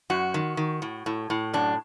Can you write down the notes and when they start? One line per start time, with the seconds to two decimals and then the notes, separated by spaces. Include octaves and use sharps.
0.10 F#2 F#4
0.34 D#3
0.57 D#3
0.82 A2
1.06 A2
1.30 A2
1.54 F#2 D4